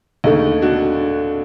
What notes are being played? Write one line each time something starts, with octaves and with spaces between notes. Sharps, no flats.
D#2 D3 A3 D#4
D4 F#4